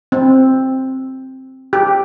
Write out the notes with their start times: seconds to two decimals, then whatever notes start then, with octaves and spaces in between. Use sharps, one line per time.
0.12 C4
1.73 G4